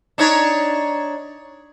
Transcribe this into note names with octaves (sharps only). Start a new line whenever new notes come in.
D4 D#4 C#5